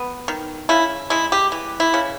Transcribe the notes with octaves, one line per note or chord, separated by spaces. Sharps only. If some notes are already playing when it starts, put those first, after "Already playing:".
Already playing: B3
D#3
C#3 E4
G#3 E4
G4
E3
E4
C#3